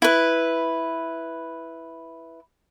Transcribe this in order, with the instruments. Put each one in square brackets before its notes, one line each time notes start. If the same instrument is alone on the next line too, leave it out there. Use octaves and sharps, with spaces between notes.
[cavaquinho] E4 B4